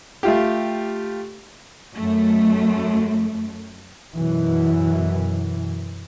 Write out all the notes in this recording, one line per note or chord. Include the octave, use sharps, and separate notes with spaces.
A3 F4 G4
F#2 A3
F#2 B2 E3